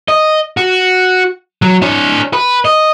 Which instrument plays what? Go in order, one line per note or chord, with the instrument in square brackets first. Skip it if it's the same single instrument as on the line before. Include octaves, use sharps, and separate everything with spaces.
[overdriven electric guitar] D#5
F#4
F#3
D4 C#5
B4
D#5